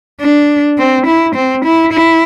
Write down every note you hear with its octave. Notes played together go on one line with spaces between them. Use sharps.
D4
C4
E4
C4
E4
E4